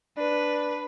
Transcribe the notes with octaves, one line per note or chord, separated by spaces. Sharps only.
D4 B4